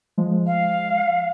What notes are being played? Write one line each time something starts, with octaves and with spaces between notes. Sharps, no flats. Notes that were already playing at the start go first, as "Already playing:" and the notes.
F3 G#3
F5